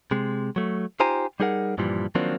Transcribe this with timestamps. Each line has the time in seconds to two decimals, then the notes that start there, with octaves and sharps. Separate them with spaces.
0.11 C3 G#3
0.56 F#3 A3
1.00 D#4 F4 G4 C5 G#5 A#5
1.40 G3 D#4 G#4 A#4 F#5
1.78 G2 A#2 E3 F3 G3
2.15 D#3 F3 F#3 A#3 C4 D4